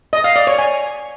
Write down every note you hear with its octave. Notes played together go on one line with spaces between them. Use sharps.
D#5
F5
D5
C#5
G#5